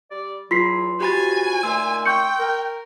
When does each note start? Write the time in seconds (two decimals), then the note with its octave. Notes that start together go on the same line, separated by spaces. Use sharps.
0.10 G3 D5
0.51 E2 F#3 F4 C6 B6 C7
1.01 E2 F3 F#4 G4 G#5 B5 A6
1.63 A#2 D#3 A3 C6 E6
2.06 G5 C#6 G6 C#7
2.39 A#4